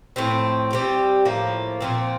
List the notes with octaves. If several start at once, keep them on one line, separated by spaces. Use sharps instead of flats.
A2 F3 C4
G3 C4 G4
A2 F3 A#3
A#2 F3 C4